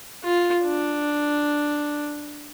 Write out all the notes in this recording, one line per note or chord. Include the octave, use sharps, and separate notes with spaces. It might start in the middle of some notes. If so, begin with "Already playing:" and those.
F4
D4